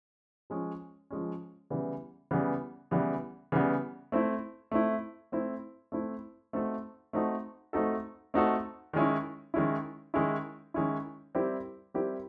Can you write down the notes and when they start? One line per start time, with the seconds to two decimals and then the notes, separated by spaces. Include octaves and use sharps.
0.50 F3 G#3 C#4
1.11 F3 G#3 C#4
1.70 C#3 E3 G3 B3
2.31 C#3 E3 G3 B3
2.91 C#3 E3 G3 B3
3.52 C#3 E3 G3 B3
4.12 A3 C4 E4
4.72 A3 C4 E4
5.32 A3 C4 E4
5.92 A3 C4 E4
6.53 A3 C4 D#4 F#4 A4
7.13 A3 C4 D#4 F#4 A4
7.73 A3 C4 D#4 F#4 A4
8.34 A3 C4 D#4 F#4 A4
8.93 D#3 G#3 C#4 E4
9.54 D#3 G#3 C#4 E4
10.14 D#3 G#3 C#4 E4
10.74 D#3 G#3 C#4 E4
11.35 G3 C4 E4 G4 A#4
11.94 G3 C4 E4 G4 A#4